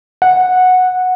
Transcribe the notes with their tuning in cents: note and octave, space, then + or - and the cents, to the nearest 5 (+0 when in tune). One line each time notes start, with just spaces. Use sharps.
F#5 -10